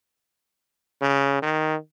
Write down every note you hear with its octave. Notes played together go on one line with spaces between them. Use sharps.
C#3
D#3